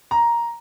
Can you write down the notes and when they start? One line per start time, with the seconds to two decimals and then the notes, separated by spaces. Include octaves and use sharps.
0.11 A#5